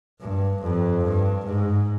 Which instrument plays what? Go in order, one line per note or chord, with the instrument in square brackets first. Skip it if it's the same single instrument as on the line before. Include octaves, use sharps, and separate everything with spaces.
[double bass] G2
F2
G2
G#2